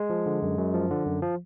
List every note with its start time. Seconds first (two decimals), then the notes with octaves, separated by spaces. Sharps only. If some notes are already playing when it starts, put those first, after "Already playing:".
Already playing: G#3
0.10 F3
0.26 D3
0.43 F#2
0.58 F#2
0.74 F3
0.90 D3
1.06 F#2
1.22 F3